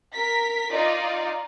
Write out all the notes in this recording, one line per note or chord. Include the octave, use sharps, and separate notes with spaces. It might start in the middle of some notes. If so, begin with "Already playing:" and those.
A#4 B6
D#4 F4 D5